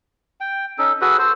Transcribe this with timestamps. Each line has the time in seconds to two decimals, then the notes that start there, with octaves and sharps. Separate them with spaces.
0.40 G5
0.78 C#4 D#4 A4
1.01 F#4 G#4 A4 B4
1.18 A4 C5